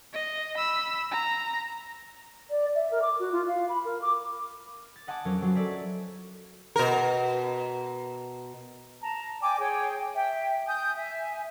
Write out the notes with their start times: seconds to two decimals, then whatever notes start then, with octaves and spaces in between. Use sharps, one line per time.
0.13 D#5
0.58 B5 E6
1.11 A#5
2.50 D5
2.75 E5
2.91 A#4
3.02 D6
3.19 F#4
3.32 F4
3.47 F5
3.68 B5
3.84 A#4
4.01 D6
4.96 A6
5.07 D#5 F#5 G#5 A5 D6
5.25 F2 F#3 C#4 A#4
5.42 F#3 F4 F#4
5.54 A4 C#5 D5 E5 A#5
6.76 B2 A#4
9.02 A5 A#5
9.40 D5 G5 G#5 D6
9.58 G#4 C#5 G5
10.15 E5 G5
10.67 G#5 D#6 G6
10.96 E5 G#5